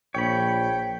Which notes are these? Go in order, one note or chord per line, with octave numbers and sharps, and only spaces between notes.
A#1 C#5 G5 B5